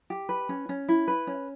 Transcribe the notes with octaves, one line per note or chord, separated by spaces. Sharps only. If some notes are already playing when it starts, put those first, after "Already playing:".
G4
B4
C#4
C#4
E4
B4
C#4